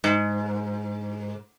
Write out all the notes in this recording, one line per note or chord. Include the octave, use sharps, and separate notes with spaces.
G#2